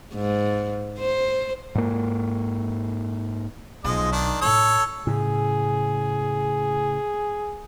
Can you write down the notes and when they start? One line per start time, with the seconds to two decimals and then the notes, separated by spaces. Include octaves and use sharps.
0.15 G#2
0.99 C5
1.75 G#2 A#3
3.84 B1 B2 F3 G#3 D#5
4.12 D#3 D4
4.41 A2 E4 A4 C#5 E6
5.07 A2 C#3 G#4